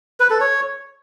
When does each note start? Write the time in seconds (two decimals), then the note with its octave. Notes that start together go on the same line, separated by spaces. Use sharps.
0.20 B4
0.30 A4
0.41 C#5